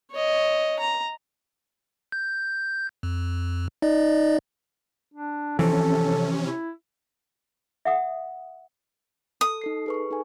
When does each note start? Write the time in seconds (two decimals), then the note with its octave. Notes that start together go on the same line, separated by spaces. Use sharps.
0.12 C#5 D#5
0.80 A#5
2.12 G6
3.03 F2
3.82 D#4 D5 D#5
5.14 D4
5.59 C3 E3 F3 C#4 A4
6.43 E4
7.85 E5 F#5 D#6
9.41 A4 D#6
9.61 D#4 A4 C7
9.86 G#4 B4 C#6
10.11 D#4 A4 G#5